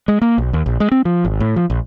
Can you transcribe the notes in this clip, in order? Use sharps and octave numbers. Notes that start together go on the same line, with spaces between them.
G#3
A#3
B1
D#2
A#1
G#3
C4
F3
G#1
A2
F3
A#1